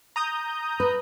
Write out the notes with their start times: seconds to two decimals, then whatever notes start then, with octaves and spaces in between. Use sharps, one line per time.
0.16 A#5 D#6 G6
0.80 B4